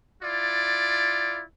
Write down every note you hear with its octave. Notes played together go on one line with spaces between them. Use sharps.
E4 F4 D5